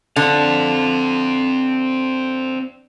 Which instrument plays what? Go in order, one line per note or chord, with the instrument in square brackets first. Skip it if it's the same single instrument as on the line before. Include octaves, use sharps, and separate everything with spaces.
[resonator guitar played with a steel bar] D3 [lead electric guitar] C4 F5